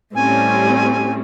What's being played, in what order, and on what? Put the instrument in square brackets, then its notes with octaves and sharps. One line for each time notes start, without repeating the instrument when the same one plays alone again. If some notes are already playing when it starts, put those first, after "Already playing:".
[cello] A2 [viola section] G3 C4 C#4 [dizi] G#5